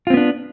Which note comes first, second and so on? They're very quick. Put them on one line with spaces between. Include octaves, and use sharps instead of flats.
F4 C4 B3 D4